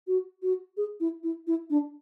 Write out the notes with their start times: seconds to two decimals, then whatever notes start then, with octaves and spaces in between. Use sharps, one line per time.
0.08 F#4
0.42 F#4
0.77 G#4
1.00 E4
1.23 E4
1.47 E4
1.70 D4